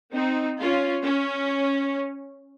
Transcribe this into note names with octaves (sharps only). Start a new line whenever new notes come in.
C4 D#4
C#4 F4
C#4